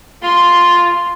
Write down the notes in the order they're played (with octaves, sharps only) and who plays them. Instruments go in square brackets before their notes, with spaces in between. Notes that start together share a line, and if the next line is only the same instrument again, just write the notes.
[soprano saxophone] F4 [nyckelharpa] C6